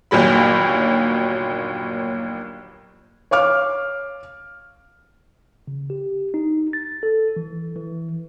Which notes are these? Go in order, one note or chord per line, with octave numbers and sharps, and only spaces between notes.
G1 D#2 A#2 F#3 B5
C#5 F5 D6 F6
C#3
G4
D#4
A6
A4
E3
E3